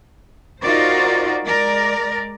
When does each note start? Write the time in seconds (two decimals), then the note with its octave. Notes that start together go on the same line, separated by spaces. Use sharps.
0.63 D#4 F4 F#4 A#4 C5 D5
1.44 G#3 A#4 D5